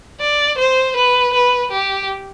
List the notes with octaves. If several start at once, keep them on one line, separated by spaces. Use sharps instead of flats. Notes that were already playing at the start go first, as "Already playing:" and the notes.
D5
C5
B4
B4
G4